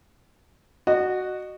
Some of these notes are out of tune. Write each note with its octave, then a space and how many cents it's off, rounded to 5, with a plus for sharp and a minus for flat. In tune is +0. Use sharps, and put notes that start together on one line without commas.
F#4 +0 D#5 -30